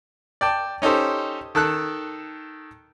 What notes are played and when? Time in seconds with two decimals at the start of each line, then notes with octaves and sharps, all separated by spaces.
0.41 D5 G5 A5
0.82 C#4 D#4 G4 A4 C5
1.55 D#3 A4 A5 F#6